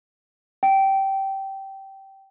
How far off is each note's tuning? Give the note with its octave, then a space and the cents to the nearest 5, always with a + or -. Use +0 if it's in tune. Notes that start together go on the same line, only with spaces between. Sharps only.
G5 -15